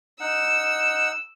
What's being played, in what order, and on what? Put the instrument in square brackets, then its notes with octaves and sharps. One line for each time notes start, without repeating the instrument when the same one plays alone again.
[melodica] D#4 F#5 [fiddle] E6